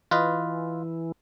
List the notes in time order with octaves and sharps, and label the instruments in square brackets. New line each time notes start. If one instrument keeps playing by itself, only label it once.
[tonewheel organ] E3 [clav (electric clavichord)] F4 B4 D#5